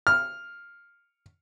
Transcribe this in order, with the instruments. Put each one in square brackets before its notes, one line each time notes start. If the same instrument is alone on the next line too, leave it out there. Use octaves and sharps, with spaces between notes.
[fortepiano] F6